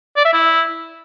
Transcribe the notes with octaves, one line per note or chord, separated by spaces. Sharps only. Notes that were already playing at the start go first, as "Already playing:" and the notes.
D5
E5
E4